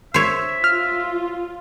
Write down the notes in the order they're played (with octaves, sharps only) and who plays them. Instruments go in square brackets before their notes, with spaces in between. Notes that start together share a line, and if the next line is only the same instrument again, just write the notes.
[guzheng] C5 C#5 [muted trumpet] E5
[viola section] F4 [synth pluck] F6